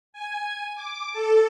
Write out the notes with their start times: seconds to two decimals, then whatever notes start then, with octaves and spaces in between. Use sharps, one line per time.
0.13 G#5
0.75 D6
1.13 A4